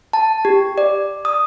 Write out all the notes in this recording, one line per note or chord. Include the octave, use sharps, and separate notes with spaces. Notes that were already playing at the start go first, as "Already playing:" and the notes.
A5
G4
D5
D#6